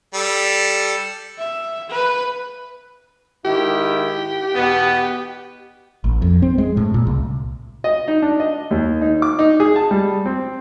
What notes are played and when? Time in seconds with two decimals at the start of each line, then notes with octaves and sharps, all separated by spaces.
0.14 G3 A4
1.38 E5
1.90 B4
3.45 G#2 D#3 E4 G4
4.55 E2 B2 B3
6.04 A1
6.22 F2
6.42 C4
6.58 G#3
6.77 A2
6.94 A#2
7.07 C2
7.84 D#5
8.08 D#4
8.22 D4
8.40 D#5
8.71 D#2
9.02 D#4
9.22 D6
9.39 D#4
9.60 G#4
9.76 A5
9.91 G3
10.26 C4